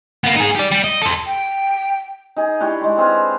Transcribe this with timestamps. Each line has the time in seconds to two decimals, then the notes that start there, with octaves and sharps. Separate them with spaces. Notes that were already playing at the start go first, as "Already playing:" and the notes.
0.24 A#3 B3
0.37 D#4 G#4
0.55 G4 D5
0.72 G3
0.84 D#5
1.02 A4 C5
1.26 G5
2.36 D#4 G#4
2.60 D4 E4 G4 C#5
2.81 G#3 C6
2.98 C4 G#4 B4 F5